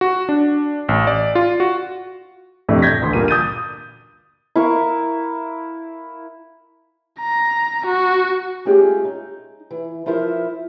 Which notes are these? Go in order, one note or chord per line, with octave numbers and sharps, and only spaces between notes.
F#4
D4
A1
D5
F4
F#4
F2 A2 C3 A3 D4
G6 G#6 A#6 B6
A1 D2 C6
G2 A#2 A#4 D#7
D#6 G6 A6 D#7
E4 A#4 F5 C#6
A#5
F#4
G#3 A3 C#4 F4 G4 G#4
D#4
E3
F3 E4 F4 A#4 C5